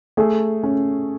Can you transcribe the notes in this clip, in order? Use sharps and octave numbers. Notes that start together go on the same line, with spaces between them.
A3 G#4
C#4